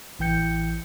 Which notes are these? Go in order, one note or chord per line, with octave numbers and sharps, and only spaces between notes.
A1 E3 G5 G6 C#7